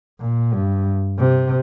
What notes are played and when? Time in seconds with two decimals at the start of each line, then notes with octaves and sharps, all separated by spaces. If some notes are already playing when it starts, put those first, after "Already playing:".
0.20 A#2
0.53 G2
1.18 C3